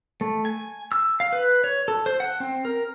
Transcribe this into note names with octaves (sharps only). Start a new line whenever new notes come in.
A3
G#5
E6
F5
B4
C#5
A4
C5
F#5
C4
A#4